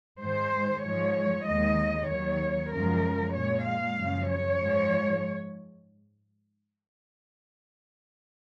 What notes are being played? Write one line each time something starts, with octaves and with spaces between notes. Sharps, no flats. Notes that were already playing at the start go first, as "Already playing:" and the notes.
G#2 D#3 G#3 C5
G#2 F3 G#3 C#5
D#2 D#3 G#3 D#5
D#2 D#3 F#3 C#5
F#2 C#3 F3 G#3 A#4
A#2 G#3 C#5
F5
F#2 C#3 F3
C#5
G#2 F3 G#3